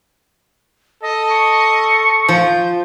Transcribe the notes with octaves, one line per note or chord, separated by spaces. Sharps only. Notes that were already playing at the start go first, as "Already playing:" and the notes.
A4 D#5
C#6
F3 G6